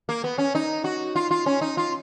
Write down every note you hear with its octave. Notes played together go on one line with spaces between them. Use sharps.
A#3
B3
C#4
D#4
F#4
F4
F4
C#4
D#4
F4